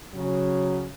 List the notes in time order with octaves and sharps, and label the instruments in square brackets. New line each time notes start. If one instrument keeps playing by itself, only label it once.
[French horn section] C#3 F#3